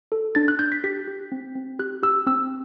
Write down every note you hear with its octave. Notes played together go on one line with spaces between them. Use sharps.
A4
D4 A6
F#6
D4 G6
B6
G4 B6
G4
C4
C4
G4 F#6
G4 E6
C4 E6